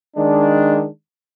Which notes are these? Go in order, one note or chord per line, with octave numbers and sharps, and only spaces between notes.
D#3 G#3 D4